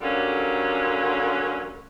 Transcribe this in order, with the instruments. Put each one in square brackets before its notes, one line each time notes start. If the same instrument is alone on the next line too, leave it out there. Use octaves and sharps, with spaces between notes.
[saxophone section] D3 F#3 G3 A3 A#3 C#4